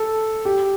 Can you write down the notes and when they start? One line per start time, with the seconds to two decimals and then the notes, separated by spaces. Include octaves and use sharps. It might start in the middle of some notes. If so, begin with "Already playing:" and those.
Already playing: A4
0.45 G4